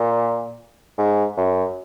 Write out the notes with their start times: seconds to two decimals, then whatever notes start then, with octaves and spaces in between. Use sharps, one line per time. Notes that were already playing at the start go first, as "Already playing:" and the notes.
Already playing: A#2
0.98 G#2
1.37 F#2